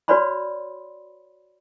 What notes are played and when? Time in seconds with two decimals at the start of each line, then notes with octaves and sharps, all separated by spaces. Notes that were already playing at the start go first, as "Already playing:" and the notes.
0.08 F#4 B4 C#5 D5 B5 C6